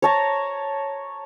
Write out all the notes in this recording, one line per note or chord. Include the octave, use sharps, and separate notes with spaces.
C#5 A5 A#5